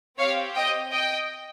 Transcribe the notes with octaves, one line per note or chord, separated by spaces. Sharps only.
C4 G4 C#5 F5
D#5 G5
D#5 G5